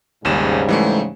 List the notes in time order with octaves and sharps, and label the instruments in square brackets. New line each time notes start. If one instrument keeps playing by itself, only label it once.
[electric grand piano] G#1 D#2 E7 [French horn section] G#2 C#3 G3
[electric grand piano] E3 G#3 A3